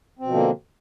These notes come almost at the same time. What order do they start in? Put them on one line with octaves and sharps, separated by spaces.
C4 B2 F3 D3 A#3